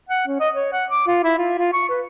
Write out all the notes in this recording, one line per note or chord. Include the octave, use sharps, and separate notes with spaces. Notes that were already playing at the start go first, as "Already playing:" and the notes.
F#5
C#4
D#5
C#5
F#5
D6
F4
E4
F4
F4
C#6
B4